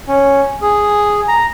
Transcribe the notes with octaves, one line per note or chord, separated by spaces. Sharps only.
C#4
G#4
A#5